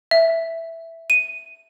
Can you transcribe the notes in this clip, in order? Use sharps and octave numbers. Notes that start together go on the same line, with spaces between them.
E5
D#7